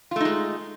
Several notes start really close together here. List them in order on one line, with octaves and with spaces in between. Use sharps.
F4 A3 D#4 G#3